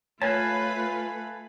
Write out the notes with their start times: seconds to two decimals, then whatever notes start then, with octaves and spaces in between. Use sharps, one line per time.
0.22 A3 F4 B4 C#5 F5 G#5 A5 B5